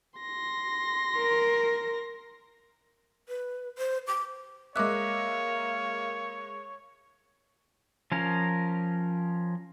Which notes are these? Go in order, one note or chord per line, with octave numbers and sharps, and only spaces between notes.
C6 A#6
A#4
B4
C5
D6
G#3 A#3 A#4 C#5 E5 D6 F#6
F3 C#4 A#4